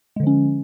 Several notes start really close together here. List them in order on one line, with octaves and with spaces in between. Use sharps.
G#3 D3 F3 C#4